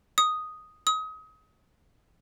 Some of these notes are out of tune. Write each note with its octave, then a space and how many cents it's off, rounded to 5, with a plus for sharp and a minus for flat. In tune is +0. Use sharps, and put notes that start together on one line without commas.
D#6 +0
D#6 +30